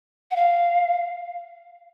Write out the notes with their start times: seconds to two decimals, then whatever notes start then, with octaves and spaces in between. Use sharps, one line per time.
0.31 F#5
0.36 F5